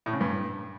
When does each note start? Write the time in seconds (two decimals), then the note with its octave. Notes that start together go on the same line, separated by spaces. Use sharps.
0.06 A2
0.13 C#3
0.21 G2